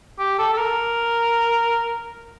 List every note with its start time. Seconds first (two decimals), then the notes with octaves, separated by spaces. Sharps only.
0.19 G4
0.39 A4
0.53 A4
0.58 A#4